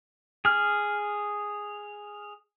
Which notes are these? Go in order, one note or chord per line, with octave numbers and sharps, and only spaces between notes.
G#4 F6